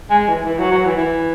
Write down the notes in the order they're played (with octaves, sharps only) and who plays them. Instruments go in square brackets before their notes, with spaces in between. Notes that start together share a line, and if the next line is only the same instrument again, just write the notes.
[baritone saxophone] G#3
E3
E3
F#3
F#3
E3
E3